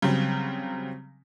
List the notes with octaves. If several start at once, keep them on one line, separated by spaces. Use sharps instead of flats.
C#3 F#3 G3 C4